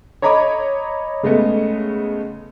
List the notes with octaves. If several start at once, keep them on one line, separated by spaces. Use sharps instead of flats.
C#5 D#5 A#5 B5 D6
C#3 G#3 A3 B3